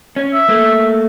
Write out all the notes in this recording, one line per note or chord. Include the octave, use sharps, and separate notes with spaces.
C#4
E5
A3 A#3